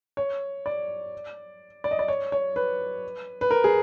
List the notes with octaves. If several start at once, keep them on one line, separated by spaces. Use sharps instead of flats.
C#5
D5
D5
D#5
D5
C#5
C#5
B4
B4
A#4
G#4